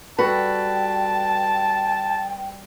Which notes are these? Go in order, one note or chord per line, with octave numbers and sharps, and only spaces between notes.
G3 F#4 A4 B4 G5 A5